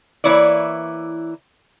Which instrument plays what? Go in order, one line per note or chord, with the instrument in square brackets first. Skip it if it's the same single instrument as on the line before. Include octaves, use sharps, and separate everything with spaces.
[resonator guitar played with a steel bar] E3 A#3 E4 C#5 D5